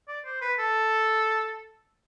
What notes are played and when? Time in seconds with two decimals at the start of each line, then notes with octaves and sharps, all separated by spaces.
0.08 D5
0.25 C5
0.42 B4
0.59 A4